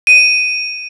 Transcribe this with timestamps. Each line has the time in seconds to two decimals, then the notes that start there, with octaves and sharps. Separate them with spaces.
0.07 D#7